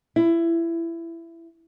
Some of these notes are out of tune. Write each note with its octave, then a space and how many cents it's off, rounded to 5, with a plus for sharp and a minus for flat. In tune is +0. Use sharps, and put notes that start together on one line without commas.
E4 +20